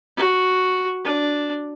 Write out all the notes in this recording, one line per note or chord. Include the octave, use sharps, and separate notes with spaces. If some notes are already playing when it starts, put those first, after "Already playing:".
F#4
D4